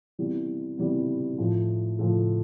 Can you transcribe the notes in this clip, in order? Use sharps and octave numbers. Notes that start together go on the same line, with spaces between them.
C3 E3 G3 B3
C3 E3 G3 B3
A2 F3 A3
A2 F3 A3